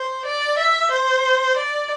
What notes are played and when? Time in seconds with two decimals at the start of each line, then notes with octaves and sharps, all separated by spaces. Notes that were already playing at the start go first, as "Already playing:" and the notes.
Already playing: C5
0.25 D5
0.58 E5
0.91 C5
1.57 D5